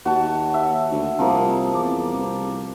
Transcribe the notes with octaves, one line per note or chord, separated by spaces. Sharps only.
D#2 F#4 A5
E5
D2
C2 F3 A#3 D#5
E2 D5 D6
C2